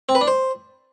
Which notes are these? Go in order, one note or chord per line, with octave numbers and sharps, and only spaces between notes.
C4
B4
D4
C5